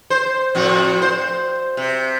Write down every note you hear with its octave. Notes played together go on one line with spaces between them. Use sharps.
C5
F2 A2 F#4
C5
C3